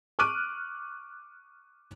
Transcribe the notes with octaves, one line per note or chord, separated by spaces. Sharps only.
C#6 D6 F6 F#6 D7 D#7